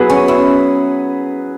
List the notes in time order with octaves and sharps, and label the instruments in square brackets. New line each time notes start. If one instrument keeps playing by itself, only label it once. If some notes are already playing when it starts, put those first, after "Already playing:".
Already playing: [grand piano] F#3 B3 G#4 B4 [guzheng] E4
[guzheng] C#4
E4